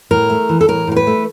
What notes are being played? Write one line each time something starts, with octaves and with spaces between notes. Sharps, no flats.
A2 A#4
A3
E3
A4
A2 A#4
A2 A#4
B4
A3